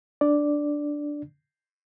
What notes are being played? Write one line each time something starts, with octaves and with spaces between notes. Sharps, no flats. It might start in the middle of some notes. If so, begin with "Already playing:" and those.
D4 D5